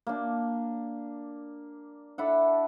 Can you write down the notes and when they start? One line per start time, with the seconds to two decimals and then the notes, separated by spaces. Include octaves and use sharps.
0.07 A#3 D4
2.18 D4 E4 A4 F#5